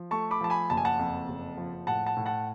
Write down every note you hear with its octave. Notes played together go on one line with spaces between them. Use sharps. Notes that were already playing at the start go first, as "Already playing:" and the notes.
Already playing: F3
A3 A5 C#6
B5 D6
F3 A5
G#5 B5
F#1 A5
G#5
F#5 A5
F2
F#1
F3
A2 F#5 A5
F#5 A5
A2
F#5 A5